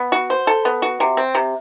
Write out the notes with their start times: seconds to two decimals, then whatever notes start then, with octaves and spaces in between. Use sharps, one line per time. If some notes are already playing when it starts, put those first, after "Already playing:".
Already playing: B3
0.12 F#4
0.30 C5
0.47 A4
0.65 B3
0.82 F#4
1.00 C3
1.17 C4
1.35 C3